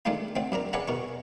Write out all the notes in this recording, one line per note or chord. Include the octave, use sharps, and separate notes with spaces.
D#3 G#3 A3 D4 D#4 F4
D3 A3 C4
F#2 D4 A#4 A#5
G#4 B4 D5 E5 F#5 A#5
B2 A#4 C#6